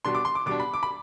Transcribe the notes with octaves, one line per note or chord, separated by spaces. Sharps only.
B2 G3 D4 C6
D6
C6
D6
B2 G3 D4 D6
B5
D6
B5